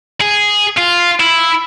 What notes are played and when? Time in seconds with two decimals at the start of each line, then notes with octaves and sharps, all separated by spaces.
0.21 G#4
0.78 F4
1.20 E4